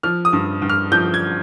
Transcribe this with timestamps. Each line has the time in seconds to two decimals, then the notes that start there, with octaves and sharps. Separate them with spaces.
0.03 F3 F6
0.25 D#6
0.33 G2
0.62 G2
0.69 F6
0.92 F3 G6
1.14 G#6